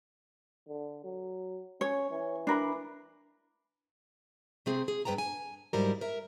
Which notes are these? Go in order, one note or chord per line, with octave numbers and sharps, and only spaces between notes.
D3
F#3
C#4 C#5
E3
D4 A#4 B5
C3 A3 C4 G#4
G#4
G2 B4 G5 A5 A#5
G#5
G#2 F#3 G3 E4 G4 A#4
A#4 E5